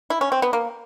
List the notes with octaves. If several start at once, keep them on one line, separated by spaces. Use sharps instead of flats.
E4
C#4
C4
B3
A#3